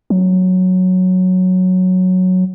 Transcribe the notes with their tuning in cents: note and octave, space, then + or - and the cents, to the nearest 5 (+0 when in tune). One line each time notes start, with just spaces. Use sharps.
F#3 -5